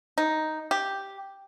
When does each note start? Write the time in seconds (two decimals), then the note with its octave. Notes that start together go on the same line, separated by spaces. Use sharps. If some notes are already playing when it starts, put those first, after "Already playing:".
0.18 D#4
0.71 G4